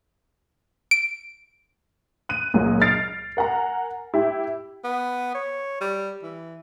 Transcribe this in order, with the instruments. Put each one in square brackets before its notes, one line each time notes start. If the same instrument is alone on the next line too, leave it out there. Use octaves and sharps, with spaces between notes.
[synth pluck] D7
[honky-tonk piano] F#6 D#7
C#2 A#2 F#3
F6 A6 C7 D7
A#4 F#5 G#5 A#5
E4 G4
[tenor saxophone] B3
C#5
G3
E3